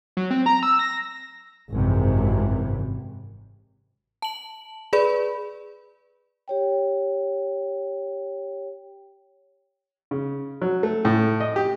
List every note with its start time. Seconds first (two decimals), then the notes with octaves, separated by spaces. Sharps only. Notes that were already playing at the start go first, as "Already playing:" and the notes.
0.17 F#3
0.31 C4
0.46 A#5
0.63 E6
0.79 A#6
1.72 G#1 F#2 C3 E3
4.22 A5 F#7
4.93 G#4 B4 D5 B5
6.48 G4 C#5 G5
10.11 C#3
10.62 F#3
10.83 A3
11.05 A2
11.40 D#5
11.56 G4